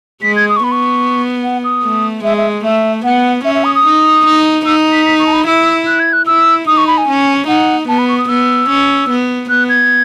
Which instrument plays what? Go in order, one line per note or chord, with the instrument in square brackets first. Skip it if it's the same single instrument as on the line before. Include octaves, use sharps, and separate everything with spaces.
[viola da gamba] G#3 [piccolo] B6
[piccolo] G#6
D#6
C#6
[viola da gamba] B3 [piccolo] B5
[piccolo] C#6
F#5
D#6
[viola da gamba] A3
[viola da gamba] G#3 [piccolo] E5
[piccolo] E5
[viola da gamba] A3 [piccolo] E5
[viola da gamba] B3 [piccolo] F#5
[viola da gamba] C#4 [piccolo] E5
[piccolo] E5
D#6
D#6
[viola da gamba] D#4
D#4
[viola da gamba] D#4 [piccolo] E6
[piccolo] B6
B6
C#6
A5
B5
[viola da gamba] E4 [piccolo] E6
[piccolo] F#6
G#6
F#6
[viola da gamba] E4 [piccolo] E6
[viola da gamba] D#4 [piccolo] D#6
[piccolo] C#6
B5
G#5
[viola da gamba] C#4
[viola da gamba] D#4 [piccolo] F#5
[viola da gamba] B3 [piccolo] A5
[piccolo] B5
C#6
D#6
[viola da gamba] B3 [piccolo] E6
[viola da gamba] C#4
B3
[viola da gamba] B3 [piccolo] F#6
[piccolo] G#6